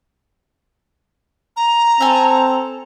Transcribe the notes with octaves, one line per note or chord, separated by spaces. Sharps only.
A#5
C4 A4 G#5